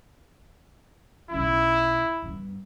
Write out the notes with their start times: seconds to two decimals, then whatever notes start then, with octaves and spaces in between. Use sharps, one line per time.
1.31 B1 C#4 E4
2.23 G2 B3